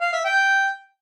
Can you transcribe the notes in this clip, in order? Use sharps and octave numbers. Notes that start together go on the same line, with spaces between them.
F5
E5
G5